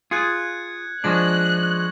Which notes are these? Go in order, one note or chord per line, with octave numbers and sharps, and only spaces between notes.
F4 G#4 F#6 G#6 C#7
F3 G#3 D4 C#6 F#6 A#6 F#7